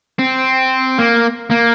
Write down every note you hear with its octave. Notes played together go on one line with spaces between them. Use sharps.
C4
A#3
A#3